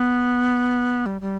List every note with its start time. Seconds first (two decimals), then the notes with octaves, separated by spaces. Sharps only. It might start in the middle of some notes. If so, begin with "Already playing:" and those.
Already playing: B3
1.06 G3
1.21 G3